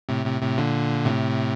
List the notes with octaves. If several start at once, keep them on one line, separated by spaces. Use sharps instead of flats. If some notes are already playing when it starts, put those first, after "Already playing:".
A2 C3
A2 C3
A2 C3
A#2 D3
A2 C3